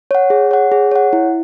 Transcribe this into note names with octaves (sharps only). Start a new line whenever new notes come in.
C#5 F#5
G#4
C#5 F#5
G#4
C#5 F#5
E4